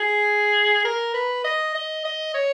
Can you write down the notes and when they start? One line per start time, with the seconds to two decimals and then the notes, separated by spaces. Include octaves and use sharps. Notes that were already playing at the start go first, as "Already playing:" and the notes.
Already playing: G#4
0.85 A#4
1.14 B4
1.44 D#5
1.75 D#5
2.05 D#5
2.35 C#5